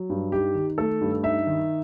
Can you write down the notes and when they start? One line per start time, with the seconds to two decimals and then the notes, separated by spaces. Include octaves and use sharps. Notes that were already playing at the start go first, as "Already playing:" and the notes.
Already playing: F#3
0.10 G2
0.32 D#4 G4
0.55 D#3
0.78 A3 A4
1.01 G2
1.23 D#4 E5
1.47 D#3